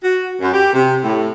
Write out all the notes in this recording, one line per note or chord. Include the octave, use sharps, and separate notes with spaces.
F#4
F#2
G4
C3
A2